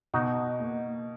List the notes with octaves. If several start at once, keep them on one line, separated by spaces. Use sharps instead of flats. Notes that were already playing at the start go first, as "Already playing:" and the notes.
B2 D#4 F#4
A#3